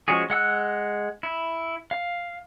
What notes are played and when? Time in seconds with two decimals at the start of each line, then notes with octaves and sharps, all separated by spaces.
0.08 F3 G#3 C#4 F#4 G#4
0.30 G#3 F#5 E6 F#6
1.23 E4
1.91 F5